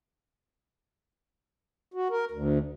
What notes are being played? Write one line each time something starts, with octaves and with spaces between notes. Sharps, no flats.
F#4
A#4
D2